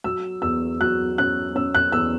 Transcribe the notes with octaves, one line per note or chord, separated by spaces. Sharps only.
F#3 E6
E2 E6
F#3 F#6
C#4 F#6
C#4 E6
F#6
E2 E6